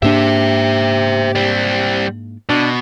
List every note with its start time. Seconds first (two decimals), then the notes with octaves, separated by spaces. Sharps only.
0.03 G#2 A#3 D4 G4 C5 E5
1.35 G3 C4
2.49 B2 D4